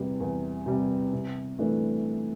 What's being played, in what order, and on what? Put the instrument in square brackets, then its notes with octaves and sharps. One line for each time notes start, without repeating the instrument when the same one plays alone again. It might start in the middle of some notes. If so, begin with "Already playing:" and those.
Already playing: [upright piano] E2 C3 G3
E2
C3 G3
C3
E3 A3 D4